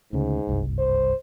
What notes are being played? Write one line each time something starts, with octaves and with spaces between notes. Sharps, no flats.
D2 G#2 C#3
F#1 C2 G2
C5